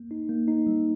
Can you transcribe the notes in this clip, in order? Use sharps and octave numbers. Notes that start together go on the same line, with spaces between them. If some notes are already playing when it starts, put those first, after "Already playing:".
Already playing: A#3
D#4
A#3
D#4
G3